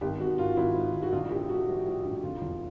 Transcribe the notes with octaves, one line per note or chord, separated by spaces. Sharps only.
G#1 G4
G#1 F#4
G#1 F4
G#1 E4
G#2
D#3
F#4
A#1 F4
A2 G4
A2 F#4
F3
A2
A#1
F1 F4
E2